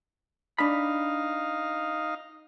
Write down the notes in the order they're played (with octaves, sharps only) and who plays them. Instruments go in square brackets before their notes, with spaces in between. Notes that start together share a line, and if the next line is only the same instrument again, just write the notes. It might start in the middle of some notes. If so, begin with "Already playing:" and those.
[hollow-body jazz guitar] D4 B5 [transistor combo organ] D#4 F5